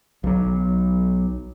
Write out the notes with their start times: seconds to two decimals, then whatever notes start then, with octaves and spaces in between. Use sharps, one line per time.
0.24 B1 F#3